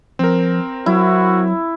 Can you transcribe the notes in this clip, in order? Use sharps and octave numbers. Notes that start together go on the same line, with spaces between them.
F3 C4 A#4
F#3 E4 F#4